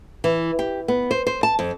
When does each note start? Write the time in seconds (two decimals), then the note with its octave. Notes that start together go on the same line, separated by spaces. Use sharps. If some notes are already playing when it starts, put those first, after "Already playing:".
0.24 E3
0.59 G4
0.88 B3
1.11 C5
1.27 C5
1.43 A5
1.59 F2